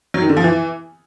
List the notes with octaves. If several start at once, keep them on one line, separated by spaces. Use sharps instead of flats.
F#3
D#3
D3
F3
E3